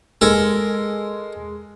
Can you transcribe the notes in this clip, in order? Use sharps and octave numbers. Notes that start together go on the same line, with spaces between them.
G#3 A4 A#4 G#5